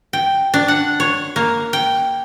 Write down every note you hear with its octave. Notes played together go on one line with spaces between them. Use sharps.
G5
D4
F#5
C#5
A#3
G5